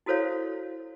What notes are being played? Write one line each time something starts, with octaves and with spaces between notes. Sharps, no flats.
E4 F#4 A4 C5 C#5 F5